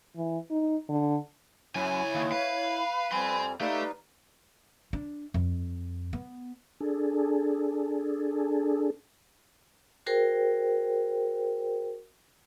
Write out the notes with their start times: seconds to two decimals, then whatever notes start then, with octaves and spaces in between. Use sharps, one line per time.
0.16 E3
0.51 D#4
0.89 D3
1.75 C#2 F#2 E4 C#5 G#5
2.14 D#2
2.32 B4 F5
3.11 F2 F3 G3 G5 G#5 C6
3.61 A3 D#4 G4 B4 D5 F5
4.93 D4
5.34 F2
6.13 B3
6.80 D4 G#4 A4
10.06 F#4 G#4 A#4 C5 G5